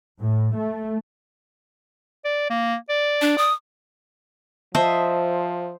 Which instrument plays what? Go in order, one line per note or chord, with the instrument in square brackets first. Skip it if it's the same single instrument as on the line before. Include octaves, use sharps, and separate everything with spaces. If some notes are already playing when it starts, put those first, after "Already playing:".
[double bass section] A2
A3
[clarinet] D5
A#3
D5
[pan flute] D4
D#6
[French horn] F3 [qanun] C5 D#5 E5 [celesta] A5